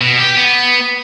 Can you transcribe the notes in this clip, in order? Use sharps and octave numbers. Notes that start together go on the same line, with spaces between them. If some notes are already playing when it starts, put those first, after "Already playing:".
B2
G4
B3